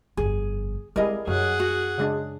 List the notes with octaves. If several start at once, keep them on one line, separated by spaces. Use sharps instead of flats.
G1 F2 G#4
G3 G#3 C4 E4 G#4 A#4 D#5
F#2 F#3 G#4 F#5
F#4
C#3 G#3 D4